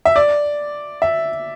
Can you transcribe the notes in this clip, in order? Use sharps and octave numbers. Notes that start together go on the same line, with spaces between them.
E5
D5
E5